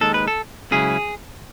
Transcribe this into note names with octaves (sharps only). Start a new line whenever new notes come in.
D#2 D#3 G#3 A4
B4
A4
C#2 C#3 F#3 C#4 E4 G#4